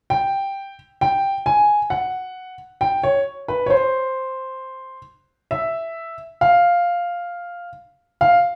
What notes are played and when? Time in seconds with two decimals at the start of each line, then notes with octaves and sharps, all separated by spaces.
0.10 G5
1.01 G5
1.46 G#5
1.90 F#5
2.81 G5
3.03 C#5
3.48 B4
3.66 C#5
3.70 C5
5.51 E5
6.41 F5
8.21 F5